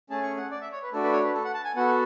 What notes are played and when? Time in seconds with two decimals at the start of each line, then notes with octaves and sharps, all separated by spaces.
0.10 A3 C#4 G#4 A5
0.23 C#6
0.37 F#5
0.51 D5
0.61 E5
0.72 C#5
0.83 B4
0.93 A3 D4 F#4 A4
1.03 B4
1.13 C#5
1.24 B4
1.35 A4
1.44 F#5
1.54 A5
1.65 G#5
1.75 B3 F#4 A4 F#5